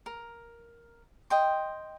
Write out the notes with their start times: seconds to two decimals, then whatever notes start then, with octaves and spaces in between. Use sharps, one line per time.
0.06 A#4
1.30 D#5 G5 C6